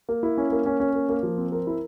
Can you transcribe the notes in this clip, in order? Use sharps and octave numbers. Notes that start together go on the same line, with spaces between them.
A#3
E4
C#4
A#3
C#4
C#4
A#3
A#3
F3
C4
A#4
E4